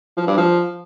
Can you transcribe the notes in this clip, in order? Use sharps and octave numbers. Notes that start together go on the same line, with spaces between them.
F3
G2
F3